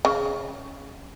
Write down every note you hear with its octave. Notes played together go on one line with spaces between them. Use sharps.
C#3